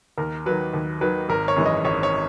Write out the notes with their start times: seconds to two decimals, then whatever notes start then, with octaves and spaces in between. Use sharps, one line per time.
0.17 D#2 A#4
0.46 D#3 F#3 B4
0.73 D#2
1.01 D#3 F#3 B4
1.29 G#1 A#4
1.48 C#5
1.56 F#2 E3 G#3
1.66 D#5
1.85 G#1 C#5
2.03 C#5